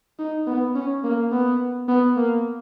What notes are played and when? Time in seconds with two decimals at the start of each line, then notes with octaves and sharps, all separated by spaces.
0.19 D#4
0.47 B3
0.75 C#4
1.04 A#3
1.32 B3
1.88 B3
2.17 A#3